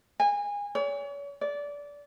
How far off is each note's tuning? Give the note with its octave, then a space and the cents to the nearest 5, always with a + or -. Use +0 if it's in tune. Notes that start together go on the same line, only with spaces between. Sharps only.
G#5 -25
C#5 +40
D5 -20